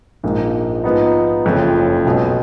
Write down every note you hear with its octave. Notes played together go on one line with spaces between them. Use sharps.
A#1 G#2 F3 A#3
G#2 F3 B3 D#4
F#1 F2 C#3 F3
B1 B2 G#3 B3